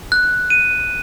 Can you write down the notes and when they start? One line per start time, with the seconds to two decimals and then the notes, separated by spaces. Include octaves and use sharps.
0.12 F#6
0.50 D#7